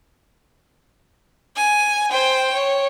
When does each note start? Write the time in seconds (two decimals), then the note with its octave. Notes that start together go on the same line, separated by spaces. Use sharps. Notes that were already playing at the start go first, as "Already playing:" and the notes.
1.56 G#5
2.11 C5 G5
2.53 C#5